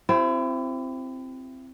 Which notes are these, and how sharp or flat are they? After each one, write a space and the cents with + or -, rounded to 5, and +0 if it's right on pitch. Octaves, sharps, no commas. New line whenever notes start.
C4 +0 E4 +35 G4 -25